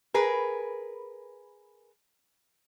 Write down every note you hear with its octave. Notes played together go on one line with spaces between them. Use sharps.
G#4 A#4 B4